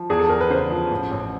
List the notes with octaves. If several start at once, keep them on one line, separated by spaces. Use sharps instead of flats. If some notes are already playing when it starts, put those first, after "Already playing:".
Already playing: F3
E2 G#4
A4
E2 A#4
B4
C#3 C5
F3
A1
A1